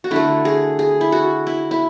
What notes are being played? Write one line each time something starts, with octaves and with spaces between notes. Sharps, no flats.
F#4
D3 A3 E4
G#4
G#4
E4
F#4
E4
E4